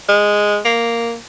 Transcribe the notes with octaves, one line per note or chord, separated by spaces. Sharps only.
G#3
A#3